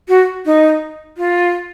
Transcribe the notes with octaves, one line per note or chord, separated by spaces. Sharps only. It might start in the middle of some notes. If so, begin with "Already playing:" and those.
F#4
D#4
F4